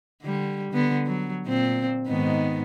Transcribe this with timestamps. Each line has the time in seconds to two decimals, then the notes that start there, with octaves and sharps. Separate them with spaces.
0.23 D3 G3
0.72 D3 B3
1.07 F#3
1.46 A#2 C4
2.07 G#2 D#3 B3